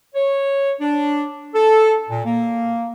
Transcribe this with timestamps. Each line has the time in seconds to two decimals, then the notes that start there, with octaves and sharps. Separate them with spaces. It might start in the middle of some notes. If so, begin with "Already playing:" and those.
0.15 C#5
0.81 D4
1.55 A4
2.09 A#2
2.25 A#3